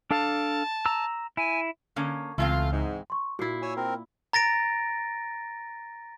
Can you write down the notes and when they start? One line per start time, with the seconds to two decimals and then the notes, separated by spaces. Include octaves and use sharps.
0.11 D4 A4 F5 A5
0.86 A#5 E6
1.37 E4 G#5
1.96 D3 A#3 C#4
2.38 C#2 E3 A3 C4 F4 F5
2.72 G#2
3.10 C6 C#6
3.39 A#2 E4 F#4 C7
3.62 C#5 G#5 E6
3.77 C4 A#4
4.33 A#5 A6 A#6 D7